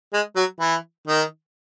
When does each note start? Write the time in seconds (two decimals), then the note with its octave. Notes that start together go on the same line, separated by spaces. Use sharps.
0.13 G#3
0.36 F#3
0.60 E3
1.08 D#3